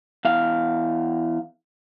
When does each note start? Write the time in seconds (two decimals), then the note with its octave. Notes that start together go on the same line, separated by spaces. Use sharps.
0.25 E2 F5